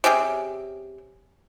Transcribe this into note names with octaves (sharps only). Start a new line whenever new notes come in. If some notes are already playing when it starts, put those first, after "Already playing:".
C3 C#4 G4 G#4